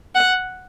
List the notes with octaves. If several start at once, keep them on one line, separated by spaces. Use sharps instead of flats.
F#5